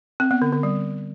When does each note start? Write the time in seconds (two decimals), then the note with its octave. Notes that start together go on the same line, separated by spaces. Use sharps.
0.20 C4
0.31 B3
0.42 D3
0.52 D3
0.63 G3